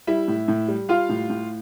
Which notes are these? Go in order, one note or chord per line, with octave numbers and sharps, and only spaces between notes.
G3 E4 E5
A2
A2
G3
G3 F4 F5
A2
A2